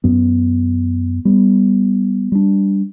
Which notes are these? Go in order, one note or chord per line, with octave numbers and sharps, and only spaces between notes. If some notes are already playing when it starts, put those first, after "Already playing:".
F#2 B3
G3 B3
G3 D4